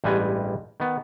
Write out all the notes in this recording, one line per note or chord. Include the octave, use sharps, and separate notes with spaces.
A1 G2 G3 G#3 B4 G#5
D#3 B3